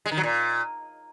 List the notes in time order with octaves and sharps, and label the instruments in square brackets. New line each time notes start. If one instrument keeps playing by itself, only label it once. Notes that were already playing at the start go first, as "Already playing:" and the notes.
[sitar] G#3
D#3
F#3
A#2